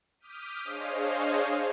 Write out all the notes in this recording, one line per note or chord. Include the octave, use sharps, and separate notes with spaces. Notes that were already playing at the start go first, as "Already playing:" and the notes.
D6 D#6 F6 G6 B6 D#7
D4 G#4 C5 C#5 D#5 F5